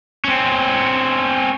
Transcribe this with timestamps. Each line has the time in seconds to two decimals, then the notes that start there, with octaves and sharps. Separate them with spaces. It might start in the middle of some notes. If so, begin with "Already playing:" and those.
0.25 C4 C#4